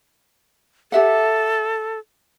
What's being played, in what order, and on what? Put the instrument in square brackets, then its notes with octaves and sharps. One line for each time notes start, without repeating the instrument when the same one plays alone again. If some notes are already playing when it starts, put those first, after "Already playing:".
[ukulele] G4 E5 F#5 [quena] A4